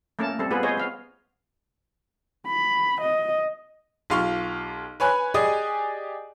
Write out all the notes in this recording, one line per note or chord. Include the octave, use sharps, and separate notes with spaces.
A3 A#3 C#4 A#4 A5
G3 C4 A4
B3 F4 G#4 B4
G#4 C5 C#5 D#5
B3 F5
B5
D#5
B1 F4 G4 F5 C6 C#6
B4 C#5 G#5 B5 F#6
G4 G#4 D5 D#5 G#5 D#6